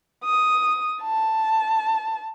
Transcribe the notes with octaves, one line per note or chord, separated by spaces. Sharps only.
D#6
A5